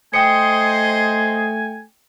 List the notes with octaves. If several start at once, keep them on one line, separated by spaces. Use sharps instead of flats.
A3 C5 D#5 G5 G#5 C#7